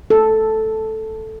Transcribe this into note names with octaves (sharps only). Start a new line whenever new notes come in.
A4